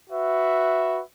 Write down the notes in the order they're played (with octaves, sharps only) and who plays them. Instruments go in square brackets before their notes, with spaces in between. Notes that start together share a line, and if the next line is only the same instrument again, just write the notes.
[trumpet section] F#4 B4 E5